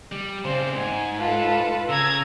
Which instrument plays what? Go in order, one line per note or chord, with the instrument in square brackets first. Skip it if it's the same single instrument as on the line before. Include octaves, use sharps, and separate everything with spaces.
[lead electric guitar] G3
[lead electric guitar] C#3 C4 [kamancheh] C5 D5
[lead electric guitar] G#2 [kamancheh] G#5
[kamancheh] F4 A5 [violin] A4 B4
[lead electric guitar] C#3 [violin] A#5 G#6 [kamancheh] E6